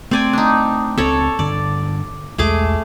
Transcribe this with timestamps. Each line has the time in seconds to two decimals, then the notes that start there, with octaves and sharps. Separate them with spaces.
0.11 A3 C4 D5 G#5
0.33 D4 D#4
0.98 C#2 C4 A4 C#5 D5
1.39 G2 D3 D5
2.38 B1 E2 G#3 A3 G#4 D6